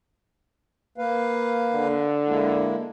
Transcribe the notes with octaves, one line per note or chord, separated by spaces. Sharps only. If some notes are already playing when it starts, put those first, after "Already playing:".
A#3 B4 F5
D3
G#3 A#3 E4